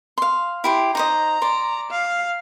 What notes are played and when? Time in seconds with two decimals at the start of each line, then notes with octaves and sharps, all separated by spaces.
0.18 F5 C6
0.64 E4 G4 C6
0.95 D#4 C5 D#5 A#5
1.42 D5 C6
1.91 F5